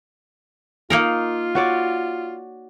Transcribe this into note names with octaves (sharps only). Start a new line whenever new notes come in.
A#3 D#4 F4 A#4
F#4 C#5 D5